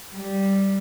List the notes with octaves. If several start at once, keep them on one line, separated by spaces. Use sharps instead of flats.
G3